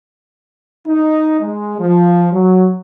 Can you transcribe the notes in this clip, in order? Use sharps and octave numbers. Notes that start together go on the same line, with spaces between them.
D#4
G#3
F3
F#3